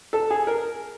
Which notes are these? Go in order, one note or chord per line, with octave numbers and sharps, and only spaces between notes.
A4
G#4
A#4